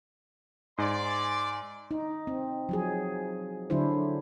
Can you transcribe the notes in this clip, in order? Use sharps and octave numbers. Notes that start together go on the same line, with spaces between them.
G#2 D5 G#5 C6
D#4
C4
F3 F#3 G#4
D3 F#3 D4 E4 C5